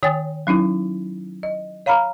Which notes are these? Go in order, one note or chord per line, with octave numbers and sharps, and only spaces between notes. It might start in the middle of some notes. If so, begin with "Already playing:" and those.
D#3 C#5 G5 G#5 D#6 A6
F#3 C#4 D#4 E4
D#5
C#5 F5 A#5 B5 F6